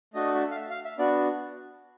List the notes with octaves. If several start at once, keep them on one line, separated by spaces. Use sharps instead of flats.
A3 D4 F#4 D#5
E5
F5
E5
F5
E5
B3 D4 F#4 D5